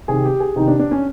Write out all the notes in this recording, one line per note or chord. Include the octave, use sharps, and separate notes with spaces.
C3 D#3 G#4
G4
G#4
C3 D#3 D#4
D4
D4
C#4